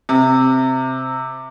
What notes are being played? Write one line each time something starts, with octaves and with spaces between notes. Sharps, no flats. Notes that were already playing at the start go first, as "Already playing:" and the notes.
C3